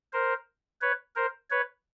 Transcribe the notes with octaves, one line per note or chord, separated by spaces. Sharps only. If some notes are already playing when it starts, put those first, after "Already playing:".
A#4 C5
B4 C#5
A#4 C5
B4 C#5